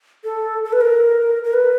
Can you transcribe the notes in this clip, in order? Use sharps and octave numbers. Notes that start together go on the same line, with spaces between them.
A4
A4
B4
A#4
A#4
B4